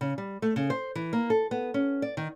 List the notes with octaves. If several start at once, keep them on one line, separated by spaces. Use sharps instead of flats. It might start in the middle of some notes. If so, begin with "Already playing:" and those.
C#3
G3
A3
C#3
C5
E3
A#3
A4
B3
C#4
D5
D#3